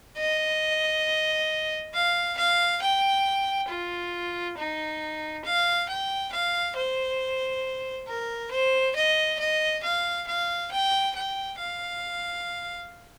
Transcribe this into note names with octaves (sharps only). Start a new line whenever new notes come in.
D#5
F5
F5
G5
F4
D#4
F5
G5
F5
C5
A#4
C5
D#5
D#5
F5
F5
G5
G5
F5